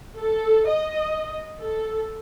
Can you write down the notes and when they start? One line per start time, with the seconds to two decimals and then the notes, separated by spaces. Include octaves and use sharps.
0.18 A4
0.69 D#5
1.60 A4